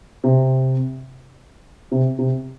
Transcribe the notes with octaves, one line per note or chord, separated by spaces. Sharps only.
C3
C3
C3